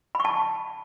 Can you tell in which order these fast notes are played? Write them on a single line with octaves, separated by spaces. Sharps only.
B5 C#6 A5